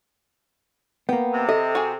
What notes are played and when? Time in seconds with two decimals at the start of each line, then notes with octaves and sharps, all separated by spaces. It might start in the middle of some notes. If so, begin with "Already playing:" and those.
1.09 A#3 B3 G5
1.33 C3
1.49 A4 D#5 E5
1.75 F#4 G#4